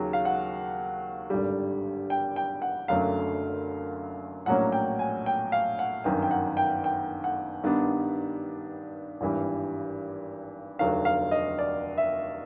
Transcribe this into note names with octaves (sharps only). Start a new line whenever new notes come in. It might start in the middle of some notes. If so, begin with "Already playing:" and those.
Already playing: D#2 C#3 F#3
F5
F#5
G#1 G2 D3 G3
G5
G5
F#5
F#1 F#2 D3 F#3 A3 F5
A#1 A2 F#3 A#3 C#4 F#5
G5
G#5
G5
F5
F#5
G1 F#2 D#3 G5
G5
F#5
G5
G5
F#5
G2 D#3 G3 B3 D4
G#1 G2 E3 G3
F1 D#2 D3 F#3 F5
F5
D#5
D5
E5